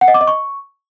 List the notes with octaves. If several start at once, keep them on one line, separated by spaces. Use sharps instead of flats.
F#5
D#5
D6
D#5
C#6